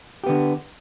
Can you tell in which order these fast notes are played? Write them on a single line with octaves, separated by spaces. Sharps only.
G4 B3 D3